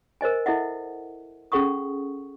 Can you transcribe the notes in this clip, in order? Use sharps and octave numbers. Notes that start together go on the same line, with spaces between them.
A#4 C5 D#5 G#5
E4 A4 D#5 E5 F#5
C#4 G#4 A4 F#5 C#6 D#6